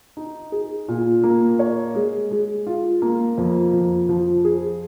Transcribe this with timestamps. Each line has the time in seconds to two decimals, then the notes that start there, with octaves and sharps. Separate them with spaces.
0.17 D#4
0.52 G#4
0.88 A#2
1.23 A#3
1.59 C#5
1.95 G#3
2.31 G#3
2.67 F4
3.02 A#3
3.38 F2
3.73 F2
4.09 F3
4.45 G#4